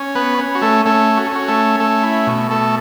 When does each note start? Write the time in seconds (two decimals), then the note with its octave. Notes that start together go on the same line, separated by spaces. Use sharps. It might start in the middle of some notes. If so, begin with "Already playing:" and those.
Already playing: C#4
0.15 B3 B4
0.38 C#4
0.55 F#4
0.62 A3 A4
0.85 A3 C#4 A4
1.17 F#4
1.26 A4
1.32 C#4 F#4
1.48 A3 A4
1.80 A3 A4
2.03 E4
2.27 B2
2.51 A3 A4